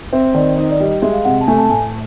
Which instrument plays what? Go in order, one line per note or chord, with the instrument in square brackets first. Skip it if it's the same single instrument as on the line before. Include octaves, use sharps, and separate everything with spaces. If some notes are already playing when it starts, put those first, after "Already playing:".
[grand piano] C4 [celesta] E5
[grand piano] D#3 [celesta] D5
[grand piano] D#4 [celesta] D#5
[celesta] D5
[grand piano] G3 [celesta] D#5
[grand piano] G#3 [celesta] E5
[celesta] F5
[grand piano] C3 [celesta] F#5
[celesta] A5
[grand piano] A3 [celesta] G#5
[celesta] A5
[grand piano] A2 [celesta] G#5